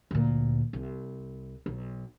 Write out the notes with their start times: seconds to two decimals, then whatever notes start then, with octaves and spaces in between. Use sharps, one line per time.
0.11 D2 A#2
0.73 C2
1.66 B1